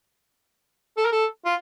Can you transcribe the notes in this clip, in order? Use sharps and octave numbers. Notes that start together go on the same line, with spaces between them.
A4
A#4
A4
F4